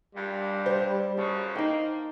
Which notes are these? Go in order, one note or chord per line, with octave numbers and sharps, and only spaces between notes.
G2 A#2 G3
C5
F#2 C#3 A5
A#3 D#4 G5